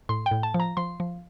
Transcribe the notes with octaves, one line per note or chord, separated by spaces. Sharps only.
A2 C6
G5
A2
A5
F3
A#5
F3 C6
F3